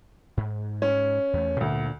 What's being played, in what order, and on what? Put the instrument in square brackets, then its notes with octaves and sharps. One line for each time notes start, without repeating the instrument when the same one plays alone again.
[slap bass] G#2
[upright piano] C#4
[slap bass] E2 A3
[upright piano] D2 [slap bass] A#2 D4